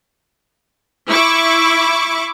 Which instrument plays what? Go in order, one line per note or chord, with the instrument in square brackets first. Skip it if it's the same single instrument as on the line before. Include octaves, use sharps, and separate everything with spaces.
[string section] E4 C#6 D6